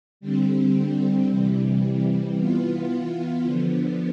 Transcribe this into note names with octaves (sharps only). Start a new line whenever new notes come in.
D3 G3 C4
C3 E3 G3
E3 B3 F4
D3 F3 B3